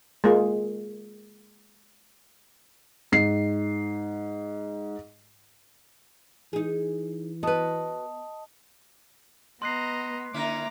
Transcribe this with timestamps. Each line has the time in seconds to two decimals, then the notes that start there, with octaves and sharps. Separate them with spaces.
0.24 G#3 A#3 F4
3.12 G#2 C7
6.53 E3 D#4 G#4
7.43 B3 F#4 B4 D#5 A5 D#6
9.62 B3 D#5 A#5 C6 F#6 C7
10.34 D3 A#3 C#4 E4 A#5 D6